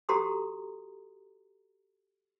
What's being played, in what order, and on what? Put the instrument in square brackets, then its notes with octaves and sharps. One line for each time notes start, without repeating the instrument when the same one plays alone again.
[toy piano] F#4 G4 A4 A#5 C6 D#6